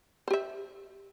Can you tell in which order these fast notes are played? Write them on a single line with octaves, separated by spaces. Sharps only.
C5 G4 E5